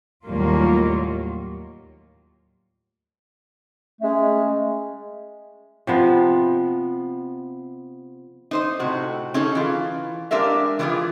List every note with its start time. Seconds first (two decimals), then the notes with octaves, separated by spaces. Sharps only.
0.24 D#2 A2 F#3 G3 A#3 F4
4.02 G#3 A3 C#4
5.87 C3 F3 B3
8.51 D#4 C5 D#5
8.79 A2 C3 F#4
9.34 C#4 D#4 G#4 A4
9.55 E3 F4
10.31 G#3 D4 G4 A#4 E5 F5
10.79 E3 G3 A#3 F4 G4 G#4